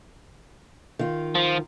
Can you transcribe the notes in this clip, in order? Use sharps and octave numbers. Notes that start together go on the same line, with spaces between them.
D#3 F4
F3